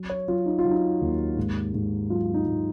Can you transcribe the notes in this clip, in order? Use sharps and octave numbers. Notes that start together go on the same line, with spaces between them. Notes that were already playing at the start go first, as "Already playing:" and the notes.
Already playing: F#3
C#5
F#3 F4
D#4
F4
F#3
D#4
D#2
G#2
G#2
F#3 F4
D#4
G#2